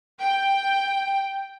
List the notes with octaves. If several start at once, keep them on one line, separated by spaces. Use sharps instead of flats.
G5